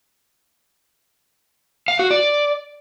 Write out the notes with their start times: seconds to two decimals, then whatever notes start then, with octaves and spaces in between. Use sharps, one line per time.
1.88 F5
1.99 F#4
2.11 D5